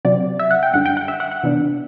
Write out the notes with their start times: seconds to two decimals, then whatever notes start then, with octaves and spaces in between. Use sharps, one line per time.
0.05 C3 F#3 C4 D5
0.39 E5
0.51 F#5
0.63 G5
0.73 F#2 D3 G3 F#5
0.86 G5
0.97 F#5
1.08 E5
1.20 F#5
1.31 F#5
1.43 C3 E3 B3 D4